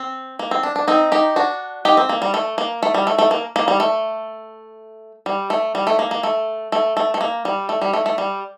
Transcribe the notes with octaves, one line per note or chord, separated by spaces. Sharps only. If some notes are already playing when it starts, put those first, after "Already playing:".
Already playing: C4
A#3
C4
D4
D4
C4 D#4
D#4 G4
D4 F#4
D#4 G4
C4
A#3
G3
A3
A#3
A3
G3
A3
A3
A#3
A#3
G3
A3
G3
A3
G3
A3
A#3
A#3
A3
A3
A3
A3
A#3
G3
A3
G3
A3
A3
G3